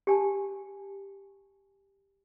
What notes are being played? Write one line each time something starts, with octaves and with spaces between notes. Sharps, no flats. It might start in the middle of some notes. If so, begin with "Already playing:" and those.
G4 G#5 A5